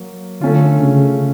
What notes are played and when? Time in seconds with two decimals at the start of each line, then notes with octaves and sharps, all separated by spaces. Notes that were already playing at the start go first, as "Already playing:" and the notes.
Already playing: F#3 A#3
0.41 D3 A3 C#4 F4
0.81 C#3